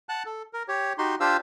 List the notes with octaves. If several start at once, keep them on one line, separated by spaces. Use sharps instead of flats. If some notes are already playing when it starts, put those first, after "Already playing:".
F#5 A5 F#6
A4
A#4
G4 C#5
D#4 F#4 G4 C6
D4 F4 G4 C5 F5 E6